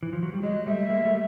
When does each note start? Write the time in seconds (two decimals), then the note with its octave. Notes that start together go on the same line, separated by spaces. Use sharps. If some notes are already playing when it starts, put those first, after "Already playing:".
0.03 E3
0.13 F3
0.23 F#3
0.34 G3
0.43 F#3 G#3 D#5
0.66 G3 A3 E5
0.90 G#3 A#3
1.05 G3 A3